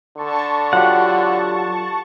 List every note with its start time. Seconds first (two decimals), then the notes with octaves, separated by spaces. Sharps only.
0.18 D3 A5 C#6
0.73 F#3 F4 G4 F#5